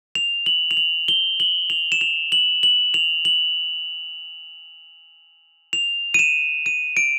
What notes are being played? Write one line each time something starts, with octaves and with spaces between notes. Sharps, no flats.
F7
F#7
F7
F#7
G7
F#7
F7
E7
F7
F#7
F#7
F7
F#7
F7
D#7
E7
D#7
D7